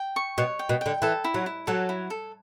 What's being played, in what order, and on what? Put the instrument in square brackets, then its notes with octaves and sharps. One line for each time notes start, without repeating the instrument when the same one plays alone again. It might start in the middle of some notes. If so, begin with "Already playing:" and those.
Already playing: [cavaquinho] G5
C#6
[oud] B2 [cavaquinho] C#5
[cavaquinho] G5
[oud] B2
[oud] D3 [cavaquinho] G5
[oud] E3 [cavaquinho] A4
[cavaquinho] E4
[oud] F#3
[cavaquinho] E4
[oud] F#3 [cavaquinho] A4
[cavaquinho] E4
A4